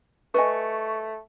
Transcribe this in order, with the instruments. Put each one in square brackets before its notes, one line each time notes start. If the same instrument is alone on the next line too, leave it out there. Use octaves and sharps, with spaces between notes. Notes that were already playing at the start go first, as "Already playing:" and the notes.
[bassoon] A3 [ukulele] B4 D#5 G#5 [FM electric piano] C#6